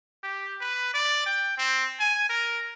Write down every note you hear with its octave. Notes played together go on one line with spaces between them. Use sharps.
G4
B4
D5
G5
C4
G#5
A#4